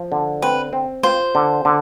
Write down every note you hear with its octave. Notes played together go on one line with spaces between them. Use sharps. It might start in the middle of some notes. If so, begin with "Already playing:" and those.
Already playing: F3
D3
C4 B4
C4
F4 C5
D3
D3